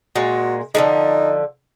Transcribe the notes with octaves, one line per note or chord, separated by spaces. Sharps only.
A#2 G#3 F#4
D3 F3 G#3 D#4